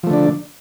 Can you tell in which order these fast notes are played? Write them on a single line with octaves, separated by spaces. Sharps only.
F3 A3 D3 D4